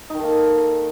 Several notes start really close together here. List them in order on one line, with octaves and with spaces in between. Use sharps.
D#4 D#3 A4 A#3